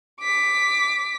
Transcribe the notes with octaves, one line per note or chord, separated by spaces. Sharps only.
D6 B6